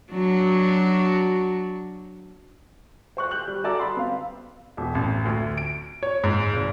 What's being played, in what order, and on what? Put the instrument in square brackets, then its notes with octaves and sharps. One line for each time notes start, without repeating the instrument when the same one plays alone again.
[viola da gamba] F#3 D4 F#4
[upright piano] C5 C#6 F#6
F#6 G6 F#7
G3
F#4 A4 D5 A#5
B5 C6
B3 C4 F5
[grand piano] E1
A1
D2
D7
C#5
G#2
G#1